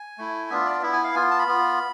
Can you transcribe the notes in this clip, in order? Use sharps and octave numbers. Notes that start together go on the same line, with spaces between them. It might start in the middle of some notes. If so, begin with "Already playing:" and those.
Already playing: G#5
A3 E4
B3 D4 F4 E5
D5
B3 E4 E5
G#5
F5
B3 F4 G#5
A5
B5
B3 F4